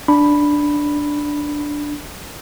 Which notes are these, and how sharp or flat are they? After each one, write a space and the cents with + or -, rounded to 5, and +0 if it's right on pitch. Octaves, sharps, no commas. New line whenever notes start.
D4 +0 B5 +0